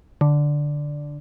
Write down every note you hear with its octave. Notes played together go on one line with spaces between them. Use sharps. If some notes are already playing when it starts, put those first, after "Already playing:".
D3